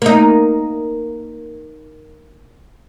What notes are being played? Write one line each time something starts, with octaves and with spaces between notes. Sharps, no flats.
A#3 D#4